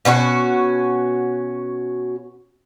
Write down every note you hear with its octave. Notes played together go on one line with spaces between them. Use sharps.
B2 C#4 D#4 F#4